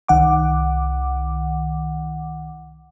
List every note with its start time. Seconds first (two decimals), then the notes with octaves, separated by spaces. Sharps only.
0.08 C2 D#3 F#5 D6